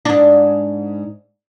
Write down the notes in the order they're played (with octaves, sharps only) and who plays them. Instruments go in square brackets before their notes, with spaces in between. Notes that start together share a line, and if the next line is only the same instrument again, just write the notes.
[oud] G#2 D4